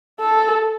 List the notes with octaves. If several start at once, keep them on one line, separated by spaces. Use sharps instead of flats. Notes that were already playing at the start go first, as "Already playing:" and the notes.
A4